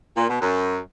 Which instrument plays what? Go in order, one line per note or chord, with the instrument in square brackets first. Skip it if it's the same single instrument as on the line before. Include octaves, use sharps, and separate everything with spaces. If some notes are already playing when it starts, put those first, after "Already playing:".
[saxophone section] A#2
B2
F#2